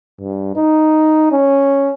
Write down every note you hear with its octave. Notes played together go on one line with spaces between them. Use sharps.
G2
D#4
C#4